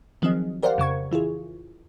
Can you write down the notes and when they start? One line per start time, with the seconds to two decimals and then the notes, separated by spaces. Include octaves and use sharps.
0.22 D#3 F3 F#3 C4 G#4 D#5
0.63 G4 A#4 C5 D5 F5 F#5
0.78 F2 C#3 C#6 G#6
1.11 E3 E4 F4 G#4